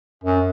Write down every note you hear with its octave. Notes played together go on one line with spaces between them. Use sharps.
F#2